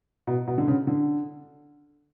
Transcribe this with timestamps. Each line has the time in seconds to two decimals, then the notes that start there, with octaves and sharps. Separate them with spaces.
0.27 B2
0.47 B2
0.58 D3
0.67 C#3
0.87 D3